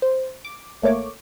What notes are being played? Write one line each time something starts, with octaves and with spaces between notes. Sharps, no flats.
C5
D6
A1 A3 A#3 C#5 D6